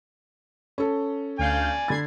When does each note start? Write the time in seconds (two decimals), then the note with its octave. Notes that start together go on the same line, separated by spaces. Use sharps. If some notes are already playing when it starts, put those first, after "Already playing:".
0.78 C#4 A4
1.39 D2 D5 F5 G#5 G6
1.88 D3 B5 G#6 A6 C7